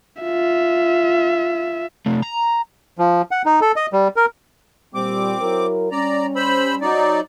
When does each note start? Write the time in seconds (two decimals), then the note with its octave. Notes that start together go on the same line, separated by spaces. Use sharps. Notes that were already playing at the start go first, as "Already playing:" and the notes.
0.23 F4 E5
2.06 C3 A3
2.23 A#5
2.98 F3
3.31 F#5
3.46 D#4
3.61 A4
3.76 D#5
3.93 G3
4.16 A#4
4.94 A#2 G3 C4 D6
5.40 F#3 E4 A#4
5.91 G3 C#4 D5 A#5
6.36 C5 B5 E6
6.81 F#3 D#4 D5